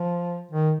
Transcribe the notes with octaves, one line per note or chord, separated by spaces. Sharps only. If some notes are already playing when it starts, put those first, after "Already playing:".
Already playing: F3
D#3